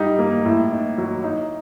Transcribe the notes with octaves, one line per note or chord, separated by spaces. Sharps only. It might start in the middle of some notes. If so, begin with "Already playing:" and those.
Already playing: G3 D#4
A#3
A2
D#4
F#3
D#4